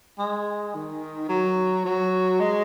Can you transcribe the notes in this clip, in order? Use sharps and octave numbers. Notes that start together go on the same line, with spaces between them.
G#3
D#3
F#3
F#3
G#3